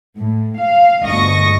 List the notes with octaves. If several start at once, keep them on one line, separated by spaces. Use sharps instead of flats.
A2
F5
G1 D2 D#5 C#6 A#6